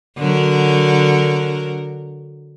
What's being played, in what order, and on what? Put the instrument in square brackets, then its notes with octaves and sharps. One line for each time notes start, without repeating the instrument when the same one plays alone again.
[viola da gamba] D3 F#3 A#4